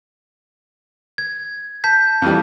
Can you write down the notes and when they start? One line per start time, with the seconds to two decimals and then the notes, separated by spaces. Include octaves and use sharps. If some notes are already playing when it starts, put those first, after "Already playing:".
1.18 G#6
1.84 A5 G6 B6
2.22 F2 E3 G3